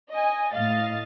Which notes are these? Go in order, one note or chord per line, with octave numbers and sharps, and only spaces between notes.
D#5 G#5
A2 D#5 F5 A6